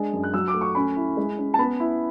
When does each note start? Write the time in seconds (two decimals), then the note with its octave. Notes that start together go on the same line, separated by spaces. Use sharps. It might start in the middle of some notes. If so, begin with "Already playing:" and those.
Already playing: G#3 D4
0.13 F#2
0.24 F#6
0.34 F#3 E6
0.48 D6
0.54 A3
0.61 C#6
0.75 C#4 B5
0.96 E4
1.17 G#3
1.38 C#4
1.54 A5
1.58 B3 B5
1.80 E4